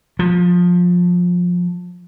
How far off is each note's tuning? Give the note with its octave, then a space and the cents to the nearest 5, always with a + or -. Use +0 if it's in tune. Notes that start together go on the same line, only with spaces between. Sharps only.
F3 +20